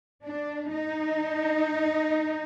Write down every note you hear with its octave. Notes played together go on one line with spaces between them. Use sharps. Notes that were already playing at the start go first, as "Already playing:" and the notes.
D4
D#4